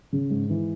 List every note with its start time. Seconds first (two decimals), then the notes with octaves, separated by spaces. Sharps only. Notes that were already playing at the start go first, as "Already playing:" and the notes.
0.13 C#3
0.30 G#2
0.50 E3